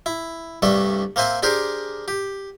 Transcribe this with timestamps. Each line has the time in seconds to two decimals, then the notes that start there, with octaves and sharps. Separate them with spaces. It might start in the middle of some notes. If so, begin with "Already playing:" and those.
0.06 E4
0.62 C2 G2 C3 A3 D4 A4
1.16 A#3 C4 C5 E5 G#5
1.43 D4 G4 G#4 A#4 C5
2.08 G4